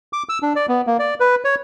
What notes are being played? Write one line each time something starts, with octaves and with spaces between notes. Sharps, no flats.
D6
E6
D4
D5
B3
A#3
D5
B4
C#5